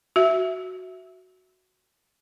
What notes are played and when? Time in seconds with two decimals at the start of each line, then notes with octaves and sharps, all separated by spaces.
0.16 F#4 E5